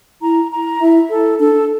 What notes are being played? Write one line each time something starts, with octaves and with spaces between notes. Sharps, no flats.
E4 A#5
A#5
E4 E5
A4
D4 A4